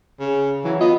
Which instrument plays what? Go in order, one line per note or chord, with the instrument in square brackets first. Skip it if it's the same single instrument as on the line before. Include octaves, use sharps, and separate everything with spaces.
[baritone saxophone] C#3
[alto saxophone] E3 [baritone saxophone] F#3
[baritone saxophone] B3 [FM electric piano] F4 [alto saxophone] D#5